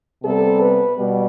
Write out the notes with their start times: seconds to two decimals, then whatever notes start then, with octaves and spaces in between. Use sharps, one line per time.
0.23 C3 G3 B3 A4
0.60 B4
0.97 B2 G3 B3